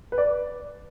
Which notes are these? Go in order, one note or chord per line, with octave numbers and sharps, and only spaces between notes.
B4
D5